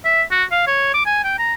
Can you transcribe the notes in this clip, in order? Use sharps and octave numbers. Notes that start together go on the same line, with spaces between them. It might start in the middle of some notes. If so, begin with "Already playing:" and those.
E5
F#4
F5
C#5
D6
G#5
G5
A#5